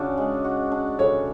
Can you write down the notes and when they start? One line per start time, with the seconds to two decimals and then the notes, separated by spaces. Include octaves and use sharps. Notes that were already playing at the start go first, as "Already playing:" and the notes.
Already playing: C#3 D4 F#4
0.18 G#3
0.44 F#4
0.72 D4
0.98 C#3 A4 C#5